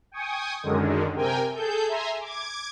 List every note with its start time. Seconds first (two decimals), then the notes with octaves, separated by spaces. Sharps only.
0.12 G5 G#5 C#6 D#6
0.63 F#2 D3 D#3 G#3
1.14 C3 A#4 G5 G#5
1.53 G#4 A4 G6
1.88 E5 G#5 A#5 C6
2.20 D6 G#6